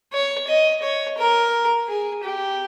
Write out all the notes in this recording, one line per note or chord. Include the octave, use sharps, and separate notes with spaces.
C#5
D#5
C#5
A#4
G#4
G4